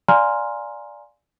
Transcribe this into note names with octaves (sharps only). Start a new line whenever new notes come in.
D5 F5 G#5 A#5 C6 F6